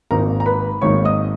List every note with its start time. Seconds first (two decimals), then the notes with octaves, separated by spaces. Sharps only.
0.11 G#1 G#2 D#3 A#3 D#4 A#4 A#5
0.40 A#5
0.46 B4 B5
0.81 G#1 G#2 D#3 A#3 D#4 C#5 C#6
1.05 D#5 D#6